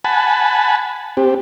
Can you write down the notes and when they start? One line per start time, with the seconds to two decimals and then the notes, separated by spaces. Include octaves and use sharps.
0.05 F#5 G#5 A5 B5
1.17 C4 G4